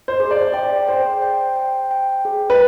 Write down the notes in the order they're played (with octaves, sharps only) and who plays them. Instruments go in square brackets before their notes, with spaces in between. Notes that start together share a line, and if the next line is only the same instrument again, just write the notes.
[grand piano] C5
[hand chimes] G#4
[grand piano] D5
[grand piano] D5 [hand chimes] G5
[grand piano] C5 [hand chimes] G5
[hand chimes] G5
G5
G5
G#4
[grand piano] B4